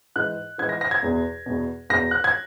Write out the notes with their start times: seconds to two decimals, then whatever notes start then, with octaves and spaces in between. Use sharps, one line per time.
0.16 G#2 E3 F#6
0.58 G#2 E3 G#6
0.69 A#6
0.81 A#6
0.91 G#6
1.03 E2 B2
1.46 E2 B2
1.90 E2 B2 A#6
2.11 F#6
2.24 G#6